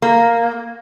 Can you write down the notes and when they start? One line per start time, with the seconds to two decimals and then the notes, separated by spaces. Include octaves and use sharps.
0.02 A#3